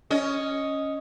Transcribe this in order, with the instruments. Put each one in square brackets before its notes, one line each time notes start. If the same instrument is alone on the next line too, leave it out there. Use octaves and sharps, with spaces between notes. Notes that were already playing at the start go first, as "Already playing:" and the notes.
[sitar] C#4 D#5